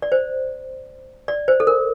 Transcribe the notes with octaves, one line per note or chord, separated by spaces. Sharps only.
D5
C5
D5
C5
A4
A#4